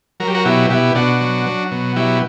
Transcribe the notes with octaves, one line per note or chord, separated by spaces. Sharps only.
F#3 A#4
G4
F#4 A#4
B2 E4 G4
B2 E4 G4
B2 D4 F#4
F#3
F#3
B2
F#3 E4 G4